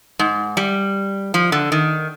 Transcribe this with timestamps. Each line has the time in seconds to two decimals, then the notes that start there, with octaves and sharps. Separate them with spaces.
0.19 G#2
0.57 G3
1.34 F3
1.52 D3
1.72 D#3